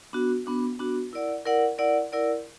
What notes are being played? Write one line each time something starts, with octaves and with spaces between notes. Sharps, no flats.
B3 D4 F#4
B3 D4 F#4
B3 D4 F#4
E4 A#4 D5 F#5
E4 A#4 D5 F#5
E4 A#4 D5 F#5
E4 A#4 D5 F#5